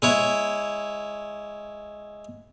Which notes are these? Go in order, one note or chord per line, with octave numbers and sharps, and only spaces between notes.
G#3 E4 C#5